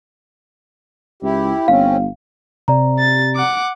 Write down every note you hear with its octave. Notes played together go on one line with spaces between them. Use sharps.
C#2 E4 G4
G1 C4 C#4 F5
C3 D5 A#5
A6
F#5 D6